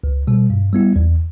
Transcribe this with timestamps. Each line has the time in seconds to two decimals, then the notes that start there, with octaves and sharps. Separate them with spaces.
0.04 C#2
0.27 B2 G3
0.50 G2
0.73 G3 B3 E4
0.96 E2